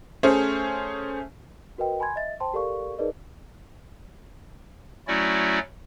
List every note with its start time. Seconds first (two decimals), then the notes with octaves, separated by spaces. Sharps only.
0.23 A3 C#4 G#4 C5
1.78 F#4 A#4 B4 D#5 G5
2.00 G#5 B5 C6 G#6
2.16 D#5 E5 A6
2.40 C5 G5 A5 C6
2.54 G4 A4 A#4 D5 F5 C#6
2.98 D#4 G#4 A#4 B4 D5 D#5
5.07 F#3 A3 C#4 E4 F#4 D5